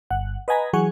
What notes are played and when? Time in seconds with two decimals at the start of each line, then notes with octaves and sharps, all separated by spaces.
0.11 G1 F#5
0.48 B4 D#5 F#5 G#5 A#5 B5
0.73 E3 F#3 G#4 F#5 G#5 C#6